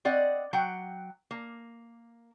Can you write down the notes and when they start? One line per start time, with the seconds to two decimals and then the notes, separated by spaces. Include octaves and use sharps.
0.05 C4 D5 D#5 F#5
0.53 F#3 F#5 G5
1.31 A#3